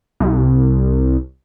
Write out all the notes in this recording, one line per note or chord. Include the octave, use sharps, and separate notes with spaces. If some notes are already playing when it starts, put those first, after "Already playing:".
C2